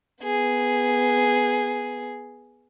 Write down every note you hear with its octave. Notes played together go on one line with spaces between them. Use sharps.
B3 G#4